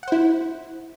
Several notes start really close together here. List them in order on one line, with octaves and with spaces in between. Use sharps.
F#5 C5 E4